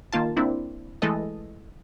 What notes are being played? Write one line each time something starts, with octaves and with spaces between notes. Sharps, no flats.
D#3 A#3 F4 A5
A#3 C4 D4 E4
E3 G#3 A3 A4 D#5